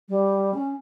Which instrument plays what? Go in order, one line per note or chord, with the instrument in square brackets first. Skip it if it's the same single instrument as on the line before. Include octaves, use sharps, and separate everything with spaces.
[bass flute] G3
C#4